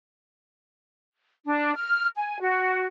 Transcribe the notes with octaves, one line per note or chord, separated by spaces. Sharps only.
D4
F6
G#5
F#4